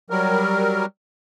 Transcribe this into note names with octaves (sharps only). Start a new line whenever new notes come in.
F#3 G3 A#4